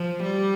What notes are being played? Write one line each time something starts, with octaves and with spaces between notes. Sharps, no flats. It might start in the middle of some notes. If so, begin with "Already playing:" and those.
Already playing: F3
G3